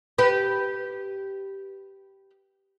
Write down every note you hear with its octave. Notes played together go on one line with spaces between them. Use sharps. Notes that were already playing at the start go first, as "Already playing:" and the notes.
G4 B4